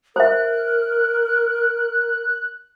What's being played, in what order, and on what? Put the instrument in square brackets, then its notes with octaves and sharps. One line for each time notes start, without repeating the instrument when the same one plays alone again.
[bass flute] A#4 [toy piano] C5 E5 [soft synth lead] F#6